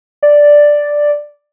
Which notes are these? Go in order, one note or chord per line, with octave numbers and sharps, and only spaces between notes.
D5